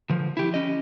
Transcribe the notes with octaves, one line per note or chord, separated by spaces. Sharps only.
D3 F3
E4 G4
C#4 D#5